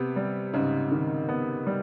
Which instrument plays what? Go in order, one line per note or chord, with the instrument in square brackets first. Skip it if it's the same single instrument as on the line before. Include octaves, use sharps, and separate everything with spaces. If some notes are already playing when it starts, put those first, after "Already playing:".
Already playing: [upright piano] C3 [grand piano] B3
[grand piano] G3
[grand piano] G#2 [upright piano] C#3
[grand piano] D#3
B3
G3